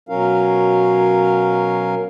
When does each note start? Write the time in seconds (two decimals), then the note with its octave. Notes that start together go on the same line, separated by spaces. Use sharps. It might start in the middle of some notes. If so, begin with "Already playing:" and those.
0.09 B2 F#3 C#4 A#4 F5